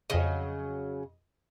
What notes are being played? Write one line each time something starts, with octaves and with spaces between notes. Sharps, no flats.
F2 C#3 F#3 D#5